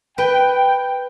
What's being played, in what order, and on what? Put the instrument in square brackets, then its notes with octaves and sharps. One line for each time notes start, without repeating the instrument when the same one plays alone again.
[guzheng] B4 [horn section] G5